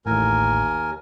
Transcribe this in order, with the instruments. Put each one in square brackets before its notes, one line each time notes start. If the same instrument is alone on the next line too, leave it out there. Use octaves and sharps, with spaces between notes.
[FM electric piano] A1 A2 [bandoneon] D#2 A#4 G#5